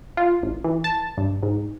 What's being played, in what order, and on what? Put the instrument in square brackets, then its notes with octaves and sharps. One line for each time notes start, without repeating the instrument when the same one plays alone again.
[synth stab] F4
A1
E3
A5
G2
G#2